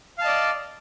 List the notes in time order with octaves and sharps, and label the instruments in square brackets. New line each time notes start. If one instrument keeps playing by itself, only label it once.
[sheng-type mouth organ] F5
A5
D#5
D5